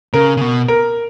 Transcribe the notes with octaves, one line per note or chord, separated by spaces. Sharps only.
C#3 A#4
C#3
B2
A#4